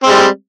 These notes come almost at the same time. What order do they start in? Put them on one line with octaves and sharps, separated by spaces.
C4 G#3 G3